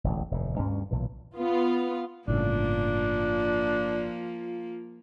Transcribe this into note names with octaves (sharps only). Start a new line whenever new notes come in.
E1 A1 D2
F1 D#2 A2
D2 G2 C#4
B1 A#2 E3
B3 F4
G1 A2 C#3 F3 A#3 D4 F4